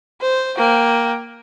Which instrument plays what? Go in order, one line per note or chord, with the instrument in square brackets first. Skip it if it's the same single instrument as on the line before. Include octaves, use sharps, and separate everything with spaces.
[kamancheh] C5
A#3 G5